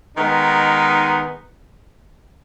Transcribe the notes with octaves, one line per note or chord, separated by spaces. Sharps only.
D#3 G#3 B3 D#4